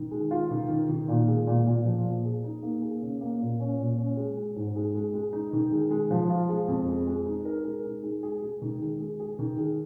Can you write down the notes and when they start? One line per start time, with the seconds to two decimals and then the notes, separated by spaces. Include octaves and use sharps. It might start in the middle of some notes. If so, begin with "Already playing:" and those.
Already playing: D#3
0.11 G#3
0.31 F4
0.51 D#3
0.70 D#3
0.89 D#3
1.08 A#2
1.28 G#3
1.47 A#2
1.67 A#2
1.85 F3
2.05 A#2
2.25 G#4
2.44 D#4
2.63 A#3
2.82 G#4
3.01 C#3
3.21 A#3
3.41 A#2
3.60 C#4
3.79 A#2
3.97 C#4
4.17 G#3
4.37 G#3
4.56 G#2
4.76 G#3
4.95 G#3
5.14 G#3
5.33 D#4
5.53 D#3
5.72 G#3
5.91 G#3
6.11 F3
6.30 F4
6.49 G#3
6.68 F2
6.88 G#3
7.07 G#3
7.26 D#4
7.45 A#4
7.65 G#3
7.85 D#4
8.03 G#3
8.23 G#4
8.42 G#3
8.62 D#3
8.81 G#3
9.00 G#3
9.20 G#4
9.39 D#3
9.58 G#4